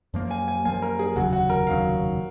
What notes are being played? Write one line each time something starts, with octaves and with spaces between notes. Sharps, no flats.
F#2 F3 A#3
G#5
G#5
F#2 F3 A#3 G#5
A#4
G#4
F1 D#2 C#3 F#3 F#4
F#4
A#4
F1 D#2 C#3 F#3 F5